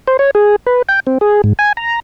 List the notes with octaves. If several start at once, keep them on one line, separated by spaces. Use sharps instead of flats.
C5
C#5
G#4
B4
G5
C4
G#4
G#2
G#5
A#5